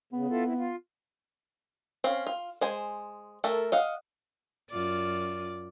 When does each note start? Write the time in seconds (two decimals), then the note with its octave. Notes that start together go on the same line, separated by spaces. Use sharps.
0.13 C#3 B3
0.30 E4 F4 A4
0.45 C4 E4
0.58 F4
2.04 C4 C#4 F5
2.27 F4
2.61 G#3 C5 G#5
3.44 A3 A4 A#4
3.72 D#5 F5 F#5
4.70 F#2 F4 D5